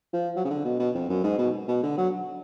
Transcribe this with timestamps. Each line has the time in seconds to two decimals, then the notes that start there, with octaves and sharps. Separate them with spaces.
0.13 F3
0.36 F#3
0.45 C#3
0.50 D3
0.65 B2
0.80 B2
0.95 F2
1.09 F#2
1.24 G#2
1.38 B2
1.68 B2
1.83 D3
1.98 F#3